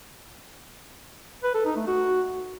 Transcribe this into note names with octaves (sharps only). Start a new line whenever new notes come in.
B4
A4
D#4
A3
F#4